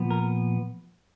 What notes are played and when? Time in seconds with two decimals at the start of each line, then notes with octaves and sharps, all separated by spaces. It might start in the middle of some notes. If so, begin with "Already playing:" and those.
Already playing: A#2 F3 B3
0.11 A#4